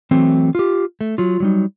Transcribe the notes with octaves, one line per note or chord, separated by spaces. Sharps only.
E3 F#3 A3 C4
F4 G4
A3
F#3 F4
F#3 G3 D#4